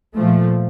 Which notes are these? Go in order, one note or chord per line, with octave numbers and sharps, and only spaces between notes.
A#2 F3 A3